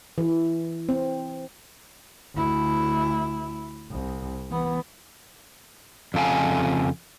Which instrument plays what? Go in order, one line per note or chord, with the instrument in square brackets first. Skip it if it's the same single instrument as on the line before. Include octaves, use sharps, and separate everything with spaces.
[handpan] E3
C4
[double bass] D2 E4
C2
E3 B3
[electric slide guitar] F2 C#3 A4 F5 G#5